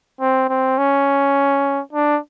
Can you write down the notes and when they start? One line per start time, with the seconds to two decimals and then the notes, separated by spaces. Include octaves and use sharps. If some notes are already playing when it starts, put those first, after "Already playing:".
0.21 C4
0.49 C4
0.78 C#4
1.93 D4